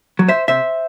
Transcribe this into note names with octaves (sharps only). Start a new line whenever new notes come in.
F#3
C5 E5
C3 C5 E5